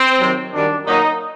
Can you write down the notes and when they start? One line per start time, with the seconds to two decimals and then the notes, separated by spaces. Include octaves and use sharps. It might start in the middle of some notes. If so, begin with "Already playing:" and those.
Already playing: C4
0.20 C3 D#3 F#3
0.53 F#2 D#3 G3 D4
0.87 A#2 F#3 A#3 D#4